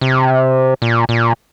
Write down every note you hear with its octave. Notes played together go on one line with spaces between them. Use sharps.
C3
A#2
A#2